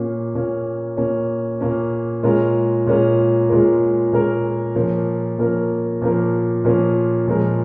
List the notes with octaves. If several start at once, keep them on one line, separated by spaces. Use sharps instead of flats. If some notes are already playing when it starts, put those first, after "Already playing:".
Already playing: A#2 A#3 C#4
A#2 A#3 C#4
A#2 A#3 C#4
A#2 A#3 C#4
A#2 G#3 C#4 F4 A#4
A#2 G#3 C#4 F4 A#4
A#2 G#3 C#4 F4 A#4
A#2 G#3 C#4 F4 A#4
A#2 F3 A#3 C#4 A#4
A#2 F3 A#3 C#4 A#4
A#2 F3 A#3 C#4 A#4
A#2 F3 A#3 C#4 A#4
A#2 F3 G#3 C#4 A#4